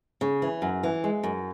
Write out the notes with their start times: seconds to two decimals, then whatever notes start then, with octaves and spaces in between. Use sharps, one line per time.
0.21 C#3
0.42 E3
0.62 F#2
0.83 E3
1.04 G#3
1.23 F#2